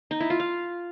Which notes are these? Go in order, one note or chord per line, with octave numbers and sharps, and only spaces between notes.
D#4
E4
F4
F5